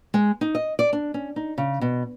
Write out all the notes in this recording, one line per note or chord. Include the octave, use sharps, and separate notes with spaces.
G#3
D#4
D#5
D5
D4
C#4
D#4
C#3
B2